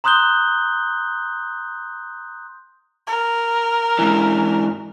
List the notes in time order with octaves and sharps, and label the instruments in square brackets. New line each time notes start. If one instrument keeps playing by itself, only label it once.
[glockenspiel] A#5 C6 D#6 F#6 G6 G7
[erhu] A#4
[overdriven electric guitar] G#2 E3